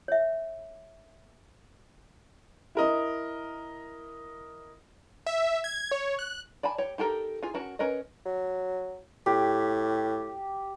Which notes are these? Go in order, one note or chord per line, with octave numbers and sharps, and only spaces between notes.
C#5 E5
E4 A#4 D#5
E5
G#6
C#5
F#6
D5 G#5 A5 B5
G4 C#5
D#4 G4 A4 A#4
F4 G#4 G#5
C#4 F#4 A#4 A5
C#4 A#4 B4 D#5
F#3
A2 G4